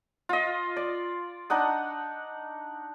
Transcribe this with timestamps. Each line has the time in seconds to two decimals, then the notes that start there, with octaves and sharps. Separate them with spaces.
0.29 F4 D#5
0.76 D5
1.50 D4 D#4 F#5 D#6